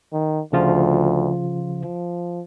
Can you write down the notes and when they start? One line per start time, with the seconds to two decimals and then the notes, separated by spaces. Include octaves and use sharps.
0.13 D#3
0.53 D2 C#3 F3 F4
1.82 F3